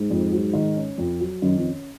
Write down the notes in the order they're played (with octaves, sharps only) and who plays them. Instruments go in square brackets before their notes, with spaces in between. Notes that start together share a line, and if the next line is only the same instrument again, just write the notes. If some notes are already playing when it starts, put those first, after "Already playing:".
Already playing: [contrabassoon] G#2
[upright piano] F2
F#3
D#3
C#4
F2
F#3
[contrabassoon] F#2 [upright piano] D#3
[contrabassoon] F2
[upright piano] C#4